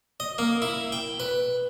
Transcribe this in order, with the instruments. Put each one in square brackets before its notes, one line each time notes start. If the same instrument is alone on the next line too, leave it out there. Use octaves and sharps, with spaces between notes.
[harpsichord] D#5
A#3
E4
G5
B4